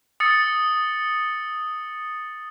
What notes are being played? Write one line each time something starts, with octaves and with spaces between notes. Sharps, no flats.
D#6 E6 A6 C#7